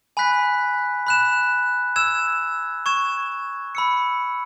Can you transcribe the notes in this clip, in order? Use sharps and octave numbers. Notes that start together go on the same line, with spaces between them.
G#5 B5 F#6 B6
B5 F#6 E7
E6 G#6 E7
C#6 G#6 E7
B5 E6 C#7